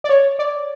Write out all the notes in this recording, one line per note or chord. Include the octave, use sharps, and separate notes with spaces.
D5
C#5
D5